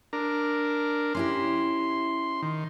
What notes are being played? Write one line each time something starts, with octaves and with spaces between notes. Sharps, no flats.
D4 A#4
C#4 E4 G4 C6
D#3